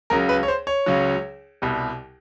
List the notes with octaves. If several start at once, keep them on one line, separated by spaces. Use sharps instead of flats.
C#2 C#3 F#3 A#4
B4
C#5
C5
C#5
C#2 C#3 F#3
C2 B2 G3